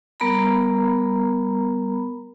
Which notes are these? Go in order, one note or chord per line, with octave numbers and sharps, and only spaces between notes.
G3 B3 A#4 A#5 B5